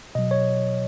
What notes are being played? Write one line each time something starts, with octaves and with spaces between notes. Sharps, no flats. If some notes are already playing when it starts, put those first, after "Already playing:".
B2 F#3 D#5
C#5